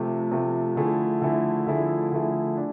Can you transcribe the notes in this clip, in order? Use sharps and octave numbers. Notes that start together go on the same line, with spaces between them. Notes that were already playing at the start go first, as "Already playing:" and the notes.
Already playing: C3 F3 A3
C3 F3 A3
D3 F3 A3 E4 G#4
D3 F3 A3 E4 G#4
D3 F3 A3 E4 G#4
D3 F3 A3 E4 G#4
D4